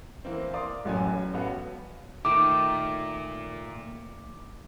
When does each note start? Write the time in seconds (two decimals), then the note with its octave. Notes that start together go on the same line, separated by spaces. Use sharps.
0.25 E3 A#3 C4
0.53 A#4 D5 F5 C6 D#6
0.85 A1 F#2 F#3 A3 C#4 G#5
1.07 F#2
1.33 A1 A3 B3 F#4 F5
2.25 A#2 D#3 A3 D6